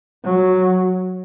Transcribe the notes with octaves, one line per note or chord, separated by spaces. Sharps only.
F#3